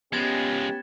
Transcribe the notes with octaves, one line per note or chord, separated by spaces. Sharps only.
F3 G#3 B3 C#4 G4 G#6 A6 E7